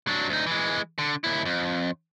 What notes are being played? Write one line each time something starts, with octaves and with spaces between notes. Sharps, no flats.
F#3 D4
D2 D#4
E3 G#3
D3
D#2 E4
F2